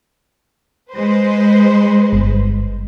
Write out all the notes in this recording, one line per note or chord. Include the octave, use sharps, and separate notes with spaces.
G#3 B4 C5
G1